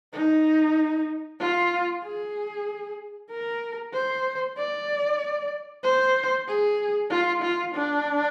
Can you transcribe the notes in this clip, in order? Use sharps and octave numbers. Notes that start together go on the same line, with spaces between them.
D#4
F4
G#4
A#4
C5
D5
C5
G#4
F4
F4
D4